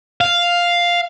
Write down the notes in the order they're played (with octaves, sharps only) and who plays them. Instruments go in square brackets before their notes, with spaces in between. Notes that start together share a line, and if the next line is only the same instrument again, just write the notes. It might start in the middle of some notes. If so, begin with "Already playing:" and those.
[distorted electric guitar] F5